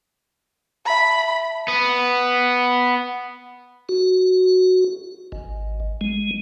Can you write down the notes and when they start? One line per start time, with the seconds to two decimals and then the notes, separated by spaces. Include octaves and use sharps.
0.86 E5 A5 B5
1.68 B3
3.89 F#4
5.32 G#1
6.01 G#3